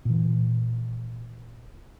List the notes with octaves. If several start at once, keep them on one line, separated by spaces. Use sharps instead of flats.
A#2 E3